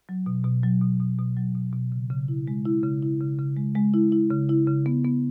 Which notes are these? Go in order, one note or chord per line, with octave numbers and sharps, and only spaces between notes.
F#3
B2
B2
F#3
B2
B2
B2
F#3
B2
B2
C#3
C#3
E4
G#3
E4
C#3
E4
C#3
C#3
G#3
G#3
E4
E4
C#3
E4
C#3
B3
B3